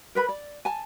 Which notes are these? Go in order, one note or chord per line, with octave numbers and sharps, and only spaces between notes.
A#4 B4 B5
D5
G#5 A5